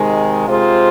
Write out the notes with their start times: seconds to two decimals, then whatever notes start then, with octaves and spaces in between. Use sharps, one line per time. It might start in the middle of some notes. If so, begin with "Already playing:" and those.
Already playing: C3 D#3 G#3
0.48 C3 G#3 F4 C5